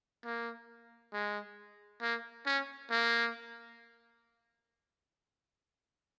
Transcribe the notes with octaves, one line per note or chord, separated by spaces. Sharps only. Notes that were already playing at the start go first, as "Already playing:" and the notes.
A#3
G#3
A#3
C#4
A#3